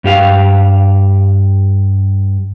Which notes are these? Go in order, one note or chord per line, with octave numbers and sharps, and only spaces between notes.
G2 G4 F5